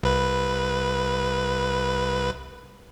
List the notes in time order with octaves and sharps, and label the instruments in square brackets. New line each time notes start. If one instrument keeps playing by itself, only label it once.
[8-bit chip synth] C2 B4